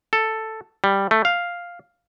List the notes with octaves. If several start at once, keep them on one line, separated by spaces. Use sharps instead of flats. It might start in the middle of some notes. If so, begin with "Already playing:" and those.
A4
G3
A3
F5